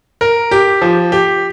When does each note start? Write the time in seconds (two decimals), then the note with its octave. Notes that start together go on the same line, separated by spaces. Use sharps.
0.21 A#4
0.51 G4
0.82 F3
1.12 G4